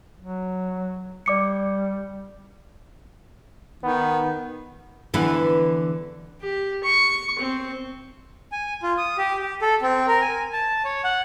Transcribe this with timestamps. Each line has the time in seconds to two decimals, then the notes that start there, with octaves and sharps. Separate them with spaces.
0.21 F#3
1.26 G3 D5 D6 C#7
3.83 D#3 B3
5.14 D3 E3 B3
6.41 G4
6.84 C#6
7.39 C4
8.52 G#5
8.83 F4
8.98 D#6
9.18 G4
9.42 G4
9.62 A4
9.82 C4
10.08 A#4
10.22 G#5
10.53 A5
10.85 C#5
11.04 F#5